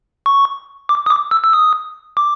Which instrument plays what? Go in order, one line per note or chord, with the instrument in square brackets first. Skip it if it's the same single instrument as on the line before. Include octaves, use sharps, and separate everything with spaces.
[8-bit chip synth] C#6
D6
D#6
D6
E6
E6
D#6
D6